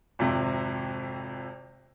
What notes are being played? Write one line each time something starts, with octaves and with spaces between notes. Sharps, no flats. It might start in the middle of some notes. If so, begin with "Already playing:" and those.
G#1 F2 C3